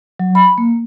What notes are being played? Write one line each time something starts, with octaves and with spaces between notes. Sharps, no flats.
F#3
B5
A#3